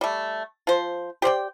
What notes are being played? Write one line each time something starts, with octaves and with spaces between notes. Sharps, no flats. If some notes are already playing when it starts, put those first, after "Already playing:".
G3 A3
F3 C5
G4 C5 D5 G5